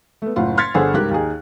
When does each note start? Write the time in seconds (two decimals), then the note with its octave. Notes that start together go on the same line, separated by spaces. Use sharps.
0.22 A3 B3
0.36 F#1 A2 F4 F#5
0.57 C6 F6 G#6 A6 B6 C#7
0.74 G1 D4 G#4 A4 C5 F#5
0.94 C#2 G#2 G3 G4 A#4 F#6
1.11 D#2 D#4 G#4